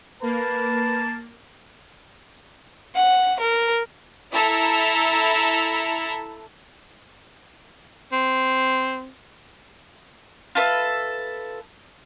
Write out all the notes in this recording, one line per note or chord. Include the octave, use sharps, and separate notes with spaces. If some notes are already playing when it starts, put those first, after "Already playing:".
A#3 B4 A5
F#5
A#4
E4 A4 E5 A#5
C4
F4 A4 B4 E5